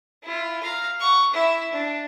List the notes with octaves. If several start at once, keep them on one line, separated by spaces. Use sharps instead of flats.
E4 F4
F5 A#5
F#5 C#6
E4 E5
D4